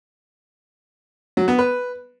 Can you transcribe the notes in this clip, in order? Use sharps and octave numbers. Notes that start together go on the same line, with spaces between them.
F#3
B3
B4